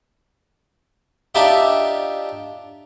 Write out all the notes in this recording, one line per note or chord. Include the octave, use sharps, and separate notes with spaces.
D4 D#4 F4 G4 E5